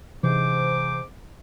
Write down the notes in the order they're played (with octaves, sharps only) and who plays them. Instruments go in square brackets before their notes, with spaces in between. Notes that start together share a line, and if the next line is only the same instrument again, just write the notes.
[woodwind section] G#2 C5 D6 [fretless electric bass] C3 E3